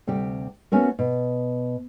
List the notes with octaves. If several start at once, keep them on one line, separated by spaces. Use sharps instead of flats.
D2 C3 G3 G4
A3 B3 C#4 F#4 A#4
B2